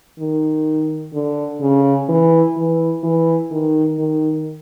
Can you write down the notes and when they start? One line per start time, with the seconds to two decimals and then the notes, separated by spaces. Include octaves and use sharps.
0.19 D#3
1.14 D3
1.61 C#3
2.09 E3
2.57 E3
3.03 E3
3.51 D#3
3.99 D#3